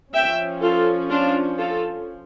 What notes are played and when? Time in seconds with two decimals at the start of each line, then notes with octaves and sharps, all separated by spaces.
0.14 F3 C#4 E5 G5
0.62 F4 A4
1.10 D4 F4
1.58 F4 A4